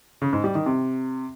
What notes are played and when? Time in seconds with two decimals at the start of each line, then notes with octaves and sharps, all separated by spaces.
0.22 C#3
0.33 G#2
0.44 G3
0.55 D#3
0.66 C3